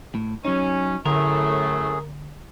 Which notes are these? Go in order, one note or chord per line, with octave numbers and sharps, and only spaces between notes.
A2
F#3 C#4 D#4
F#2 A2 D3 A3 G#4 A#4